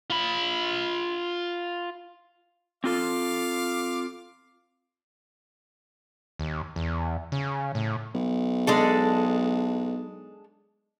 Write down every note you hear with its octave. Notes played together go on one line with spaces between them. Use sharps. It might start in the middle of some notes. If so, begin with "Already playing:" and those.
F4 B5
C4 F4 A4 F5 D6
D#2
E2
C#3
A2
B1
G#3 D4 A4